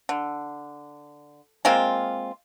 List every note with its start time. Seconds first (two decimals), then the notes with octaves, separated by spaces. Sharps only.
0.09 D3
1.65 G#3 A#3 C4 F4